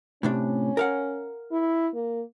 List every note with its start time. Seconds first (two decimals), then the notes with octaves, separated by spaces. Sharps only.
0.23 A2 C3 C#4 D4
0.77 A#4 F5 F#5
1.52 E4
1.94 A#3